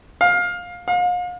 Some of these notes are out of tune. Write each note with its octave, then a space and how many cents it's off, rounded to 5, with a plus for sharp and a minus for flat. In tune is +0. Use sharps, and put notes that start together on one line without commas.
F5 +20
F5 +40